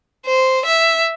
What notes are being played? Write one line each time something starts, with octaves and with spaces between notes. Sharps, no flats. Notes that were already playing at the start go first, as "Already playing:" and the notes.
C5
E5